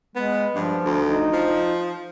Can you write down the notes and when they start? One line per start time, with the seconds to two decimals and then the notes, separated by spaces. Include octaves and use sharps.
0.16 G#3 B3
0.56 G2 F3
0.85 D2
1.05 D#4
1.33 F3